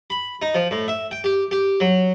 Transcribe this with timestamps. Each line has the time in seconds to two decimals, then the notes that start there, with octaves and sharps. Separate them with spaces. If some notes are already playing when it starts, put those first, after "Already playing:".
0.10 B5
0.42 D#4
0.55 F3
0.71 A2
0.88 E5
1.11 G5
1.24 G4
1.51 G4
1.80 F#3